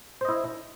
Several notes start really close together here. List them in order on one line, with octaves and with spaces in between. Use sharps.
C5 D#5 E4